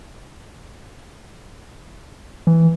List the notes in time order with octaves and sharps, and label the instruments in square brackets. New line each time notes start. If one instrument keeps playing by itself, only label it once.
[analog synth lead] E3